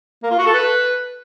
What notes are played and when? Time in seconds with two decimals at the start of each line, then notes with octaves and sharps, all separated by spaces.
0.23 A#3
0.31 F4
0.39 F#4
0.46 A4
0.54 B4